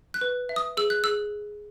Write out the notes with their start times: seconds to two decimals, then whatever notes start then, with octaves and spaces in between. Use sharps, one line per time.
0.14 F#6
0.21 B4
0.49 E5
0.56 D#6
0.77 G#4 E6
0.90 F#6
1.04 G#4 E6